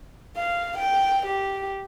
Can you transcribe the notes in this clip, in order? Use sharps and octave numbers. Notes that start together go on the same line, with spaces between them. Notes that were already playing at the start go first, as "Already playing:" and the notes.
F5
G5
G4